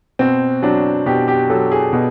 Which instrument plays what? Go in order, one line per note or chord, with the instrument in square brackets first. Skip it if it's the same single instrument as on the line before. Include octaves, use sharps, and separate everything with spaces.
[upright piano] B2 C4
F#3 D4
B2 G4
G4
F#3 A4
G#4
B2